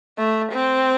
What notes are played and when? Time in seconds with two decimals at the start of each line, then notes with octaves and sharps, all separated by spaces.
0.18 A3
0.52 C4